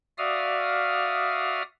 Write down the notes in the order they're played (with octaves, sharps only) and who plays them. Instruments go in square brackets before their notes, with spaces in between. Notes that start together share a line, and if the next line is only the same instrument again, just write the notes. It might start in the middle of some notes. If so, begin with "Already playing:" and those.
[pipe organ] F#4 D5 E5 F5 D#6 F6